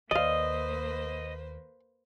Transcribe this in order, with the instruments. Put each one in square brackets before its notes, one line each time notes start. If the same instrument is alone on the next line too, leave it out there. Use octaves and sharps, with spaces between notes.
[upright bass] D#2 [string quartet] A#3 B4 C5 [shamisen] D5 F5 [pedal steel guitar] D#5